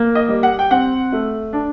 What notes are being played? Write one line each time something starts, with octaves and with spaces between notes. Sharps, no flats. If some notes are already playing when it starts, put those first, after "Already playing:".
Already playing: A#3
D#5
G3
F#5
G5
C4 F#5
A3
D4